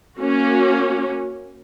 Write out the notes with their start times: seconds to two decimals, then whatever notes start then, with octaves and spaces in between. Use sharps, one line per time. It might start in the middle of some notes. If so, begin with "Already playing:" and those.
0.18 A#3 C#4 F#4